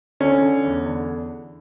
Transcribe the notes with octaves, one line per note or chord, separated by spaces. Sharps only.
D3 C#4
D3
E2
D3